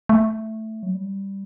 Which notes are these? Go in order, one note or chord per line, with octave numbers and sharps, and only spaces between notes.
A3
F#3
G3